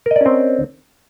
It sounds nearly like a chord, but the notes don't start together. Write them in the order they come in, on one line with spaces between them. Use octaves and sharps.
A#4 D#5 D5 C#4 C4